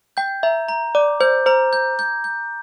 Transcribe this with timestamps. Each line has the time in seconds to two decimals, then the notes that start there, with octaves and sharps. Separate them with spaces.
0.17 G5 G6
0.43 E5 A#5
0.69 A#5
0.95 D5 D6
1.20 C5 G6
1.46 C5 A#5
1.73 G6
1.99 G6
2.24 G6